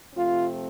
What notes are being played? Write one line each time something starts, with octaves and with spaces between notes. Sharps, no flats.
C3 F3 A3 C4 F4